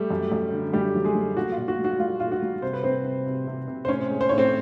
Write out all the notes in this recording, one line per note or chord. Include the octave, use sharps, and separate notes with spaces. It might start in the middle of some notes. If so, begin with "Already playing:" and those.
Already playing: G3 A3 G4
F#2
F#2
D3
F#2 G3 G4
F#3
G#3 G#4
F#3
A#2 F#4
F4
A#2
F#4
G3
F#4
G3 F4
A#2 F4
F#4
G3
C3 C5
B4
C3 C4 C5
C3
C3
C3
C3
C5
A2 C#4 C#5
G#3
C5
A2 C#5
C4 C5